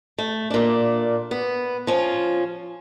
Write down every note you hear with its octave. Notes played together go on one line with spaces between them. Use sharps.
A3
A#2 D4
B3
F3 C#4 F4